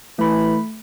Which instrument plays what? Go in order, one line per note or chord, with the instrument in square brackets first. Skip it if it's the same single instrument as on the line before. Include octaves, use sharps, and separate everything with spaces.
[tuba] E3 [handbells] A3 B5